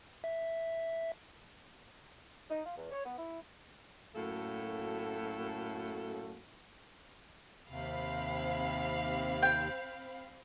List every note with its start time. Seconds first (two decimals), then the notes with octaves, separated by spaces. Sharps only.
0.24 E5
2.50 D#4
2.66 F4
2.77 E2
2.91 C#5
3.06 B3
3.18 E4
4.14 F#2 A2 A#3 F#4 A4
7.69 D#2 C3 C4 F5 B5
9.43 G5